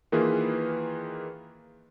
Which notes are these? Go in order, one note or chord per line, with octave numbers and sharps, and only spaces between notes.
D#3 E3 A#3 F4 G#4 B4